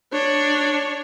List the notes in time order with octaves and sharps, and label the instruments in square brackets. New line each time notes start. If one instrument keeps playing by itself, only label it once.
[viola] D4 C#5